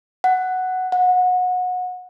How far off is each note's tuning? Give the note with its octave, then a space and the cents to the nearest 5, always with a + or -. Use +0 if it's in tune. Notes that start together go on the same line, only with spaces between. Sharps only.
F#5 +5
F#5 -25